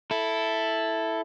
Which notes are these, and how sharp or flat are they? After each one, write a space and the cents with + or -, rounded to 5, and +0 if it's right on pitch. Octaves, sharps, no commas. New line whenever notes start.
E4 +0 A4 +0